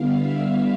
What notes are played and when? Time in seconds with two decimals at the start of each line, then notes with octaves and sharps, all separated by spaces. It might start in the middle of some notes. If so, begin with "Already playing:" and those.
Already playing: D3 G3 B3 E4 F5
0.16 E5